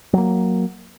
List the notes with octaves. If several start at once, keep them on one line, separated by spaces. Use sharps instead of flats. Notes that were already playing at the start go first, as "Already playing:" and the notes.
F#3 A#3